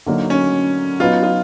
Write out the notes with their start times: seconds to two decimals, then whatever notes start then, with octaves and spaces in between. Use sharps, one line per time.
0.06 D3 F#3 A#3 D#4 F#4
0.30 C#4
1.00 F#3 B3 D#4 F4
1.23 F4